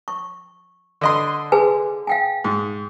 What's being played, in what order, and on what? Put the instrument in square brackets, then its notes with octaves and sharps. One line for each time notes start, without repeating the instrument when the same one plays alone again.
[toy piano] C#6
[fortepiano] D3 D#5 C6
[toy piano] G#4 B4 G#5
F5 G5 G#5
[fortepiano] G#2